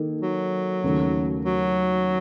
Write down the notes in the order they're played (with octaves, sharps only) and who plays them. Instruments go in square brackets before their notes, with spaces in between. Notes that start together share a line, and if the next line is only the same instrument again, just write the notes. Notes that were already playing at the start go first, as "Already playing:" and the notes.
Already playing: [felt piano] D#3 A#3 D#4 A4
[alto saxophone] F#3
[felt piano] D#2 C#3 A3
[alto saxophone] F#3